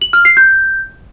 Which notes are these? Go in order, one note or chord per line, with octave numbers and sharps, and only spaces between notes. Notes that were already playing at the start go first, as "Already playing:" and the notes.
F#7
F6
C7
G6